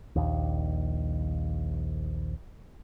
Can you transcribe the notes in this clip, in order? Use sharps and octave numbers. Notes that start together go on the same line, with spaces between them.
A#1 D#2